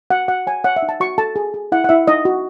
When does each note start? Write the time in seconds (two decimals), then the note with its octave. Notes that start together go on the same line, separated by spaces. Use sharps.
0.10 F#4 F#5
0.28 F#4 F#5
0.47 C#5 G#5
0.64 C#5 F#5
0.76 E5
0.82 D#4
0.89 A5
1.00 F#4 C#6
1.18 A4 A5
1.36 G#4
1.54 G#4
1.72 E4 F#5
1.84 F#5
1.89 E4 E5
2.08 D#4 D#5
2.25 F#4